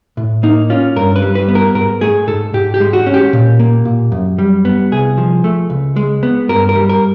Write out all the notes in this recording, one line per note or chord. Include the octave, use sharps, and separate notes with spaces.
A2
A#3 D#4
C#4 F4
G2 A#4
B4
G3
B4
B3
A#4
G#2 A#4
A3 G#4
G#2 A4
G#2 G4
G4
G#3
F#4
C#4
G4
A#2
A#3
A#2
F#2
G3
B3
C2 G#4
F3
A3
C#2
G#3
B3
G2 A#4
A#4
G3
A#4